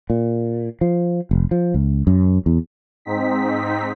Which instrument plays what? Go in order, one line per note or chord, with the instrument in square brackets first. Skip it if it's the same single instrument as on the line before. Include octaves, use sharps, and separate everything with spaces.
[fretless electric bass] A#2
F3
F1
F3
C#2
F#2
E2
[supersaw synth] G#2 C4 D#4 B6